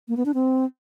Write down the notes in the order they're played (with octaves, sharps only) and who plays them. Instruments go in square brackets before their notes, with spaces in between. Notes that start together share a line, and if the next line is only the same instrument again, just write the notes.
[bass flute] A#3
B3
D4
C4